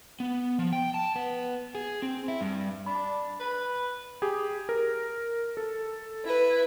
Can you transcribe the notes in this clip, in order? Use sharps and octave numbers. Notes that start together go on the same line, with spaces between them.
B3
F3
G5
A5
B3
G#4
C4
E4
G2
D4 B5
B4
G4 G#4
A#4
A4
E4 B4